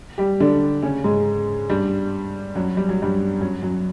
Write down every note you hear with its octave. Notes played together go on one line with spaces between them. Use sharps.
G3 G4
D3 D4
C#3 C#4
G#2 G#3
G2 G3
F#2 F#3
G3
F#3
G2 G3
F#2 F#3
F#2 F#3